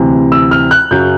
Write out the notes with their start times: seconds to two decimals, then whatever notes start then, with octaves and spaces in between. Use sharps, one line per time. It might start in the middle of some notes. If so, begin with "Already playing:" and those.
Already playing: D2 C3 E3
0.32 E6
0.51 F6
0.71 F#6
0.91 F#2 C#3 F#3 G6